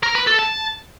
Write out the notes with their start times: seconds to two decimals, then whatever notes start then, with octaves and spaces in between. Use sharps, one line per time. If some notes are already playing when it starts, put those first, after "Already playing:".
0.03 A#4
0.15 B4
0.27 A4
0.39 A5